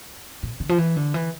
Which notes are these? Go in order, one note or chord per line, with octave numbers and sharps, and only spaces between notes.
A#2
D3
F3
E3
D3
E3